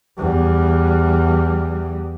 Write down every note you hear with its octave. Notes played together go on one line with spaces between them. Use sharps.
E2 G3